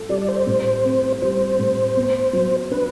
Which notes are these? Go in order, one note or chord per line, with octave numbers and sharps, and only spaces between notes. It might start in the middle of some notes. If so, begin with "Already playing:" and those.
Already playing: A4
G3 D5
D5
C5
A2
C4
G3 C5
A2
B3
F#3
D4 B4